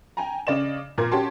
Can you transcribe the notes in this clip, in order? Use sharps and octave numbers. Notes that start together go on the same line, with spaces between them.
G5 G#5 A#5
C#3 D5 D#5 E7
A#2 A#4 G#6
C#4 F#4 G4 A5 C6